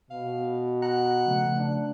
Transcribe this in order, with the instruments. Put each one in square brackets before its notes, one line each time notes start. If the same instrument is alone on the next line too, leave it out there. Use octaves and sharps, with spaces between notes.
[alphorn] B2 [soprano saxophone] F5
[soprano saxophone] F#5 [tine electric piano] A#5
[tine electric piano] C#3 F3 A3
[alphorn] D4